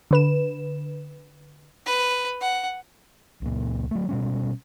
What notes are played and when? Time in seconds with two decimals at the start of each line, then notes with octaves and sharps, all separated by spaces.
0.11 D3 B4 E7
1.86 B4
2.41 F#5
3.42 C#2 A#2
3.91 F#3 A3
4.09 B2 G3 C#4